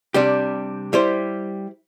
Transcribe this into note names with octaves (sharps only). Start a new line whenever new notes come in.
C3 G3 D4 G4
G3 E4 G4 C5